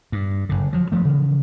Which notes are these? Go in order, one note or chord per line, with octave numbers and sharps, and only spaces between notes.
G2
F#1 B1 D3
F3 F#3
G2 F3 A3
C#3 E3 F3